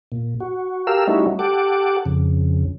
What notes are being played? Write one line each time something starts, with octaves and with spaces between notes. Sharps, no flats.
A#2
F#4
G4 A4 A#4 F5 E6
G3 A3 C#4 D#4 E4 F#4
G4 A4 F#5 D6
F2 C#3